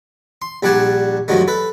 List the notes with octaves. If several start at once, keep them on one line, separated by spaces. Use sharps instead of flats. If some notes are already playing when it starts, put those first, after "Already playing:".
C6
A#1 G3 D4 F#5 G#5 A5
G2 D3 F3 F#3 G#3 A3
A4 B4